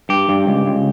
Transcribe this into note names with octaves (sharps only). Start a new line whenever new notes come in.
G2 G4
G2
C#2
C#2